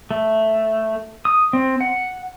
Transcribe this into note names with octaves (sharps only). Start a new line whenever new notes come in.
A3
D#6
C4
F#5